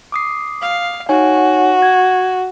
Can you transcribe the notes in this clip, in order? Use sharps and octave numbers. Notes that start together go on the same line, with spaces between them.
D6 D#6 C7
F5
D#4 F#4 C#5 G#5
G#6